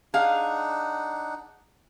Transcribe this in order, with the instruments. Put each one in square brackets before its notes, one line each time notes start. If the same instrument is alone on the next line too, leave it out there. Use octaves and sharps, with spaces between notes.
[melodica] D4 D#4 F#5 [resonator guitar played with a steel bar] G#4 F5